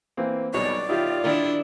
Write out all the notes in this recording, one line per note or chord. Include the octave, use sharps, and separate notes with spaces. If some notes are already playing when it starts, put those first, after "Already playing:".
E3 A#3 C4
B1 B2 G3 C#5 D5
D#3 E4 F4 G4
D#3 D4 E4 A#4